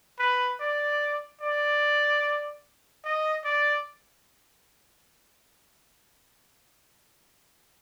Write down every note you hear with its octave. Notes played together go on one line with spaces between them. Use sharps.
B4
D5
D5
D#5
D5